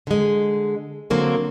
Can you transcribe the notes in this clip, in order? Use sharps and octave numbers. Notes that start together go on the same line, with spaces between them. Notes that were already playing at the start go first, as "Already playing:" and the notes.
D3 G#3
D3 F#3 A#3 C4 A#4